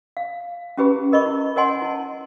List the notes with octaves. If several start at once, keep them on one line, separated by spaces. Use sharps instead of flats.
F5
C#4 E4 G4 G#4 B4 B5
A#4 D#5 B5 C#6
E4
A#4 C#5 D#5 F#5 G#5 C6
E4 A5